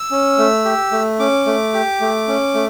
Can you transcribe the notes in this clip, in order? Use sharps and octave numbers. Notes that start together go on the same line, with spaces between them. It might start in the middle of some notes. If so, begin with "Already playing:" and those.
Already playing: E6
C#4
A3
G4
A3
C#4 D6
A3
G4
A3
C#4
A3